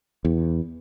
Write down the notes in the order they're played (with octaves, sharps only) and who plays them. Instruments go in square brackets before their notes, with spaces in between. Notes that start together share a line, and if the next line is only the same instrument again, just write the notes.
[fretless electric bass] E2